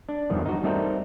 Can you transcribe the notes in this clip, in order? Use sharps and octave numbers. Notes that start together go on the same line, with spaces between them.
D4
E2 G2 D#3 F3
D#4 F#4
G3 A3 C4 D#4 A4 A#4